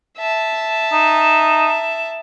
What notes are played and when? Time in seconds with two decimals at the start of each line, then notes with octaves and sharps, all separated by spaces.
0.18 E5 A5
0.92 D#4